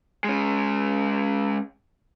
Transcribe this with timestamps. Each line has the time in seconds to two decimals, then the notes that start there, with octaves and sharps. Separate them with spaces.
0.24 G#3 C#4